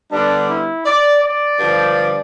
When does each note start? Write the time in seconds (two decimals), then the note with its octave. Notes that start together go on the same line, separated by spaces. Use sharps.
0.11 D3 G3 B3 D4
0.48 E4
0.85 D5
1.22 D5
1.58 G2 D3 F3